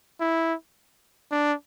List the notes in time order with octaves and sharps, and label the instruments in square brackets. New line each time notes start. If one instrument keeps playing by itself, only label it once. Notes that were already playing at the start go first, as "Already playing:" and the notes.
[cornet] E4
D4